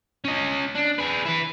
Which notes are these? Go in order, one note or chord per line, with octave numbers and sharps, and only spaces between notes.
C#4 D#5
D4
G#4 B4
E4 B4